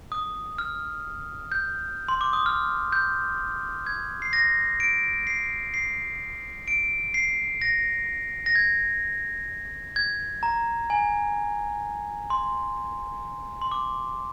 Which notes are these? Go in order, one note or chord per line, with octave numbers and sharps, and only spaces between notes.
D#6
F6
G6
C6
D6
D#6
F6
G6
G#6
C7
A#6
D7
C7
C7
D7
C7
A#6
A#6
G#6
G#6
A#5
G#5
C6
C6
D6